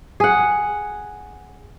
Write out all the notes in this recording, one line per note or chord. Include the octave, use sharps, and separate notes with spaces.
G#4 F#5